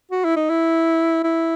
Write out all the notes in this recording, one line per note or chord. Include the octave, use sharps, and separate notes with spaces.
F#4
E4
D#4
E4
E4